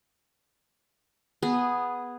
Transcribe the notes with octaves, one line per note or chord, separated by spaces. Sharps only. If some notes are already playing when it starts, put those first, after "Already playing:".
B3 G#4